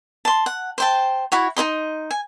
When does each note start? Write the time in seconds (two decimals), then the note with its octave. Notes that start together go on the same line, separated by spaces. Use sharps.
0.25 A5 C6
0.46 F#5
0.78 C5 G5 A5
1.32 E4 F#4 C#5
1.57 D#4 G#4 D#5 C6
2.11 G#5